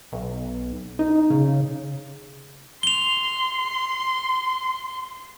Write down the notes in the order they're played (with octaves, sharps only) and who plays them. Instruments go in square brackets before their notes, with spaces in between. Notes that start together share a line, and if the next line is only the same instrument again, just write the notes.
[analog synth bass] B1
D#4
C#3
[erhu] C6 [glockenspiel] F7 G7